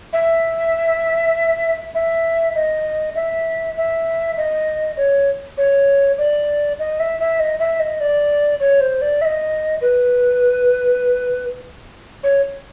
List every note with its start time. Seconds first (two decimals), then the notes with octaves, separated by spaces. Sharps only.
0.13 E5
1.95 E5
2.55 D#5
3.15 E5
3.77 E5
4.37 D#5
4.97 C#5
5.58 C#5
6.18 D5
6.79 D#5
7.00 E5
7.19 E5
7.40 D#5
7.60 E5
7.80 D#5
8.00 D5
8.60 C#5
8.80 C5
9.01 D5
9.21 E5
9.25 D#5
9.81 B4
12.23 C#5